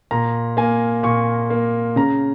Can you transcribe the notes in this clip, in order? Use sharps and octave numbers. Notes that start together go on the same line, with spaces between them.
A#2 A#5
A#3 G#5
A#2 C#6
A#3
C#3 A#5